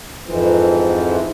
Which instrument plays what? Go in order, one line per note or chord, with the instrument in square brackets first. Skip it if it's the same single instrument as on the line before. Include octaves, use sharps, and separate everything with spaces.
[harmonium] F2 G#2 E3 F3